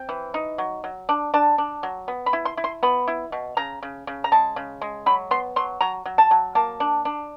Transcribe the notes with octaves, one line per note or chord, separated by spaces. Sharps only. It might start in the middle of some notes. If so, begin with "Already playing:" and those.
Already playing: C4 G5
E3
D#4
F#3
F#3
D4
D4 A5
D4
F#3
B3
B5
E4
C6
E4
C6
B3 B5
E4
B2
C#3 A#5
C#3
C#3
A#5
G#3 A5
C#3
G#3
F#3 B5
B3 C6
F#3 C6
F#3 A#5
F#3
A5
F#3
A#3 A5
D4
D4